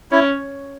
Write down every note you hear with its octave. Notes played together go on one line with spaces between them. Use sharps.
C#4 E4